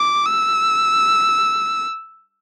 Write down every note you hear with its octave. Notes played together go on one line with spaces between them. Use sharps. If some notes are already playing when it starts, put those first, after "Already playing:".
Already playing: D6
E6